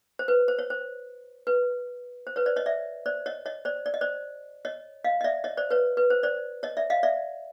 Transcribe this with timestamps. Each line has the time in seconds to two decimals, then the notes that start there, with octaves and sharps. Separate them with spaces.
0.19 C5
0.28 B4
0.48 C5
0.59 C#5
0.70 C5
1.47 B4
2.27 C5
2.36 B4 C#5
2.46 C5 D5
2.56 C#5 D#5
2.66 D5 E5
3.06 C5 D5
3.26 C#5 D#5
3.46 C#5 D#5
3.65 C5 D5
3.86 D5
3.94 D#5
4.01 C5 D5
4.65 C#5 D#5
5.04 D#5 F5
5.21 D#5
5.24 D5 E5
5.44 C#5 D#5
5.57 C5 D5
5.70 B4 C#5
5.97 B4
6.10 C5
6.23 C5 D5
6.63 C#5 D#5
6.77 D5 E5
6.90 D#5 F5
7.03 D5 E5